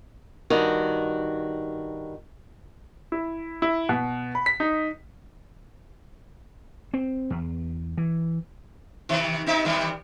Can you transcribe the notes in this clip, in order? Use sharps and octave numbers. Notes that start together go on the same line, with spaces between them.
G2 D#3 F#4
E4
E4
B2
B5
B6
D#4
C4
E2
E3
C3 D#3
C3 D#4 E5
C3 D#3 G3